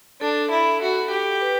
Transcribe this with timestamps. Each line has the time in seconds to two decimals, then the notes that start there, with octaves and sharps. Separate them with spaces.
0.21 D4 A4
0.51 E4
0.82 F#4
1.11 G4
1.41 B4